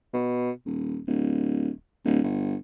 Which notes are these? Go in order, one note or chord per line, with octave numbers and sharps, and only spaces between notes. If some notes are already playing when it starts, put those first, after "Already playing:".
B2
D#1
D1
D1
G1